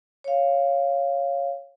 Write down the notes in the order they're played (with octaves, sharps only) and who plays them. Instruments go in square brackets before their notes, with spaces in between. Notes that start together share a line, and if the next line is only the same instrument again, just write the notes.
[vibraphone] C#5 F5